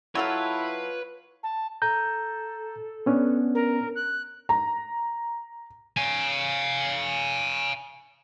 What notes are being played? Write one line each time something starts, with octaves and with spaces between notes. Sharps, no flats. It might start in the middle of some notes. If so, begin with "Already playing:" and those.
F#3 E4 F4 A4 B4 C#5 F5
A5
A4 A#5 G6
B3 C#4 D4
A#4
F#6
A#5
F5 G#5